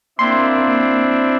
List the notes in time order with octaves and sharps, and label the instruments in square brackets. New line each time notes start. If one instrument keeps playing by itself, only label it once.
[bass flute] A#3 [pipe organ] C4 D4 E4 [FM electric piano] C6